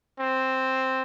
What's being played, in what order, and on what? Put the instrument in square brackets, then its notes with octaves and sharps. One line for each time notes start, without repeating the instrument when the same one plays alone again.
[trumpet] C4